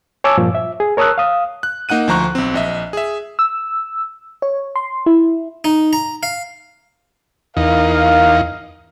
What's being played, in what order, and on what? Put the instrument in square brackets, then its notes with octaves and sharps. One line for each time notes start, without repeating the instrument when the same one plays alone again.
[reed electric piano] C#5 G#5 A5 C#6 D6 E6
G2 A#2 F3
E5
G#4
A#4 C#5 A5 D#6 E6 F#6
F5 D#6
[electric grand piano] F#6
A#3 D#4 F#5 F#6 D#7
D2 F3 C5 A#5 C#6 F#6
B1 C4
A#1 D#5 E5
G#4 E5
[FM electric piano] E6
C#5
C6
E4
[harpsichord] D#4
A#5
F5
[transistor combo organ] E2 D#4 [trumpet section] A#4 F5